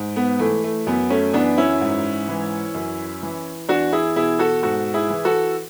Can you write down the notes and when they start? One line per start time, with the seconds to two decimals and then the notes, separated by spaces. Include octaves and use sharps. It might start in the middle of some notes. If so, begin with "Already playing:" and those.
Already playing: G#2
0.16 B3
0.39 E3 A3
0.64 A3
0.87 F#2 B3
1.10 A3 C#4
1.33 E3 B3 D4
1.58 C#4 E4
1.81 G#2
2.29 E3
2.75 F#2
3.23 E3
3.69 E2 D4 F#4
3.92 E4 G#4
4.16 B2 E4 G#4
4.39 F#4 A4
4.63 G#2 F#4 A4
4.94 E4 G#4
5.10 E3
5.25 F#4 A4